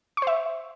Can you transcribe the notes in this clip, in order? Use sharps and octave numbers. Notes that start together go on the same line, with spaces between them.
C5 E5 C#6